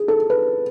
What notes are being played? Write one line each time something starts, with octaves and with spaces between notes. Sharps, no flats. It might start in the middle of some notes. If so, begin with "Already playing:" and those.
Already playing: G#4
A4
B4